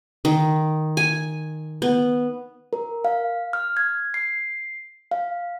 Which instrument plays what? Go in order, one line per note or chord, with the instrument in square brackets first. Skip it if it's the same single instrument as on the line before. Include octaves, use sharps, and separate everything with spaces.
[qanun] D#3
G#5
B3
[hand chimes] A#4
F5
F6
G#6
C7
F5